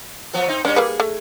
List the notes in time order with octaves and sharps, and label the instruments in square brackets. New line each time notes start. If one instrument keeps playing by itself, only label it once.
[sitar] F3 F#3 B3
C4 D#4
[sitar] G3 A#3 C#4 [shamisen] D4
[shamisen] G3 A#3 B4 [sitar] G#4
[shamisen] A3